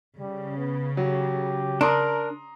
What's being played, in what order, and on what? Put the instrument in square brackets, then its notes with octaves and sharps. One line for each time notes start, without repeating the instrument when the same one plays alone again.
[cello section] C#3 [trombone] G3
[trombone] B3
[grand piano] F#3 [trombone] G4
[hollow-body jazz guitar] D4 [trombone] A#4 [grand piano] A#5 C6 D#6